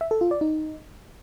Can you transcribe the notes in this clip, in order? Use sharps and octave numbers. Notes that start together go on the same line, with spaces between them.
E5
A4
F4
D5
D#4